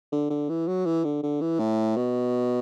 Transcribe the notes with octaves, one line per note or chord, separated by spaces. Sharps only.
D3
D3
E3
F#3
E3
D3
D3
E3
A2
B2